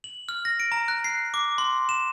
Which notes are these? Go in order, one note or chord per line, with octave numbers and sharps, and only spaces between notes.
F#7
F6
A#6
D7
A#5
F#6
C7
D6
C6
E7